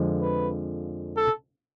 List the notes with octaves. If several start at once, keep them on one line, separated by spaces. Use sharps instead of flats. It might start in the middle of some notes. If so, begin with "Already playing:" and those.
Already playing: F2 D3 F3 G#3
B4
A4